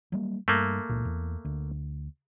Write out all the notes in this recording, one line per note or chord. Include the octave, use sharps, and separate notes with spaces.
F#3 G3 A#3
G2 A3 A#3
C#2 A#2
E2
D2